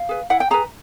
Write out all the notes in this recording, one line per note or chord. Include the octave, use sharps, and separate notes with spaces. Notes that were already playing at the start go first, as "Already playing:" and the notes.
Already playing: F5
G#4 B4
E4 F#5
G5
G#4 B4 A#5